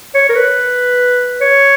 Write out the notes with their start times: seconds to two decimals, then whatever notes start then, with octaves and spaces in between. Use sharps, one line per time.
0.15 C#5
0.29 A#4
0.35 B4
1.41 C#5